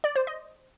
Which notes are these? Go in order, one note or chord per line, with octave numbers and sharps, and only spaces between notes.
D5
C5
D#5